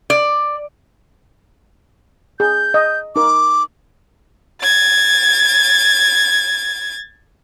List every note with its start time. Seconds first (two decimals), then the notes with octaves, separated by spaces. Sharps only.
0.10 D5
2.40 G#4 G6
2.74 D#5
3.16 D#4 A#4 D6
4.62 G#6 A6